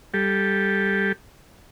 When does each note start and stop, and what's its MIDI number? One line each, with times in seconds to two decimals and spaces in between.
0.14 1.12 55
0.14 1.12 67
0.14 1.12 69